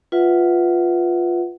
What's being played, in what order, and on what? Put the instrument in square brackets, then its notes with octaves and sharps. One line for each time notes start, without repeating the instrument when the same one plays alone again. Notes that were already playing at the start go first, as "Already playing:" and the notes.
[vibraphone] F4 B4 E5 F#5